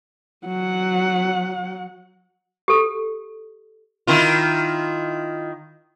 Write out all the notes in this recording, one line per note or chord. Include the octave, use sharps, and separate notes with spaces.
F#3 F#5
G4 A4
D#3 E4 F4